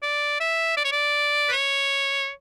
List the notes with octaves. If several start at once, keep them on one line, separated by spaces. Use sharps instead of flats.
D5
E5
D5
C#5
D5
B4
C#5